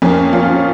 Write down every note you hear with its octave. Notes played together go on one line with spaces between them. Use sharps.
F2 A#3 C#4
C#4 F4
F3